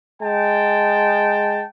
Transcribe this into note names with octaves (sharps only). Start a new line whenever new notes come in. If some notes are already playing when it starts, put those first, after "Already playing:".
G#3 G5 A5